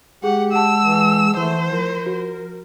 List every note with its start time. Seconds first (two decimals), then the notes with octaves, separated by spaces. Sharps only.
0.24 G#3 G4 G#4 F#5
0.52 F#5 A5 E6
0.84 E3
1.37 E3 A3 C5
1.72 F3 A#4
2.06 F#4